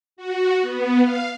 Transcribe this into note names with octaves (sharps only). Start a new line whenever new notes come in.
F#4
B3
F5